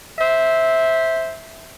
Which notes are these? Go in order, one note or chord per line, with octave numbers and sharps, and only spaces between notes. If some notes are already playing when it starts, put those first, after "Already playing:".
C5 E5